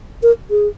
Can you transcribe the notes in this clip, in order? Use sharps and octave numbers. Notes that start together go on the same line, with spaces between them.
A#4
G#4